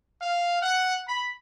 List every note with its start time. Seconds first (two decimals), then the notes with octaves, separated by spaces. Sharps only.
0.20 F5
0.61 F#5
1.06 B5